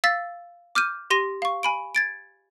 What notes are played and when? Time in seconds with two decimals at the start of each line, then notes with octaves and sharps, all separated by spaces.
0.04 F5 E6 A6 B6
0.75 D6 F6 G6 D#7
1.10 G4 C6 A#6 D#7
1.42 F5 C#6
1.63 G#5 B5 D7
1.95 G#6 A6 D7